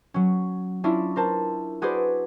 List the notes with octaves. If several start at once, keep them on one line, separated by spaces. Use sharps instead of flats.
F#3 C#4
C#4 D4 E4 F4
A#4 C5 A5
F#4 G#4 B4 C5 D5